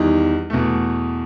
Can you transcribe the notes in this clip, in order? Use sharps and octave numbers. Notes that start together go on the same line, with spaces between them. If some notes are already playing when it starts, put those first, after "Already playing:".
Already playing: E2 D#3 G3 D#4
E2 B2 A3